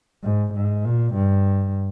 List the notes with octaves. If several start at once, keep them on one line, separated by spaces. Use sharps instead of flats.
G#2
G#2
A#2
G2